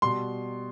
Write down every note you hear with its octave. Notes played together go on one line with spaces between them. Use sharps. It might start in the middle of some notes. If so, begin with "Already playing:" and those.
B2 G3 C6